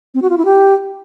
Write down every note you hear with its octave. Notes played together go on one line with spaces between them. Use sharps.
C4
F#4
F4
E4
G4